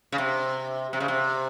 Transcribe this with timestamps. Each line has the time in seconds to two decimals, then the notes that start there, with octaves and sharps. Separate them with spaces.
0.12 C#3
0.18 C3
0.93 C3
1.00 C#3
1.08 C3